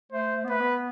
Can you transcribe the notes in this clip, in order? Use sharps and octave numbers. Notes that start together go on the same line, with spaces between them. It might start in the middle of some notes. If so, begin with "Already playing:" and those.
A3 C5
A3
B3
A3 B4
B3